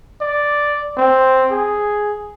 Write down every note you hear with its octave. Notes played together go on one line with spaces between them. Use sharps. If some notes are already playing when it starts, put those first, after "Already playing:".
D5
C4
G#4